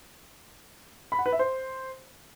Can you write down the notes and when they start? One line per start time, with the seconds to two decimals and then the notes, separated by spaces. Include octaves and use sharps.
1.12 B5
1.19 F#5
1.26 B4
1.32 E5
1.39 C5